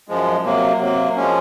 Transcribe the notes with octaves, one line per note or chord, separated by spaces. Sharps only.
F#2 F3 G#3
C3 F#3 A#3
C3 F#3 A#3
F3 G#3 C#4